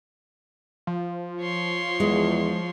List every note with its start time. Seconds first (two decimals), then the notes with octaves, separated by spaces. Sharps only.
0.87 F3
1.41 C#5 C6
2.00 E2 G#3